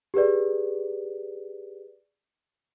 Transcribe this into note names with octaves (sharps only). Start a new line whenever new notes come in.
G4 G#4 B4 D5